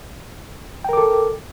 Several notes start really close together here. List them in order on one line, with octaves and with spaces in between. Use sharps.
G5 A#4 D6 A4